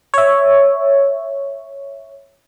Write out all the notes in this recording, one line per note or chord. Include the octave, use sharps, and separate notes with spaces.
C#5 E5